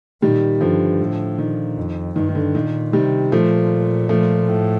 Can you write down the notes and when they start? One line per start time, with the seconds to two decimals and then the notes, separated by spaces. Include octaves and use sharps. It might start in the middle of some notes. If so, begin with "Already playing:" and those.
0.22 A#2 D#3 G3
0.60 G2 D3 F3
1.00 A2
1.38 A#2 D#3
1.77 F2
2.15 G2 D#3
2.29 D#3
2.35 D3
2.55 A#2 D#3
2.93 C3 D#3 G3
3.32 A#2 F3 A3
4.09 F3 A3
4.49 A2